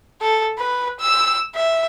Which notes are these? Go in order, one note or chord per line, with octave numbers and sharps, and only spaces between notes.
A4
B4
E6
E5